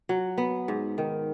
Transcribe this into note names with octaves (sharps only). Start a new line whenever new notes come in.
F#3
B3
G#2
D#3